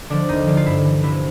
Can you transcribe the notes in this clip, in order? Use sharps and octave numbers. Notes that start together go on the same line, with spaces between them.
D3 F3 D4
D#2 D#4
D3 F3
F4
G2 E4
E3
C2 E4